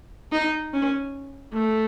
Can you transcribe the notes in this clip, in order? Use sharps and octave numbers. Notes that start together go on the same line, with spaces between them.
D#4
C#4
A3